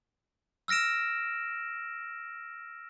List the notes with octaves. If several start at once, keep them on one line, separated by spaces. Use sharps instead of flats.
E6 F6 A#6 D7 E7